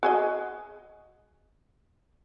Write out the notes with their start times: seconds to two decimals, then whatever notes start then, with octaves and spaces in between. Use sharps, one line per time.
0.03 F#4 G#4 D#5